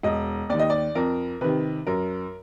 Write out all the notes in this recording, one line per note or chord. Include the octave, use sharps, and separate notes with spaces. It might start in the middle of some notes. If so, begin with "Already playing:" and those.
E1 D#5
D#2 D#3 D5
D#5
D5
F2 A#4
C3 D#3 B4
F#2 A#4